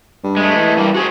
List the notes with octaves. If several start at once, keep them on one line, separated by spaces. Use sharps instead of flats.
G2
G#3 A3
E3
G2 G3 A#3
F#4 G#4 C5